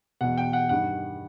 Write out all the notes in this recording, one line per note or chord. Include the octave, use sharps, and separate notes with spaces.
E2 B2 F#5
G5
F#5
G2 D#3 F#5